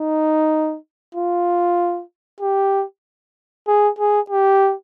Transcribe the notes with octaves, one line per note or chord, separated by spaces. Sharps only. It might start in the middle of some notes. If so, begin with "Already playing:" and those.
Already playing: D#4
F4
G4
G#4
G#4
G4